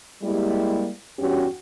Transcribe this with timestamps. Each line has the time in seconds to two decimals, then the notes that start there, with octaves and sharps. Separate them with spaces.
0.22 G3 G#3 A#3 E4 G4
1.19 E2 G2 C#4 F#4 G4